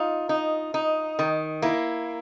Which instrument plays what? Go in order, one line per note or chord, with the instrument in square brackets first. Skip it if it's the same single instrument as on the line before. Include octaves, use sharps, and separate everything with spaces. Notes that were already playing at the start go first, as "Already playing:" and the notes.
Already playing: [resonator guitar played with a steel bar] D#4 [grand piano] F4
[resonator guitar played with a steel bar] D#4
D#4
D#3
[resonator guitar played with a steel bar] A#3 [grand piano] E4